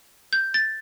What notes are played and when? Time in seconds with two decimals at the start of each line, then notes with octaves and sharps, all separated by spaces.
0.33 G6
0.54 A6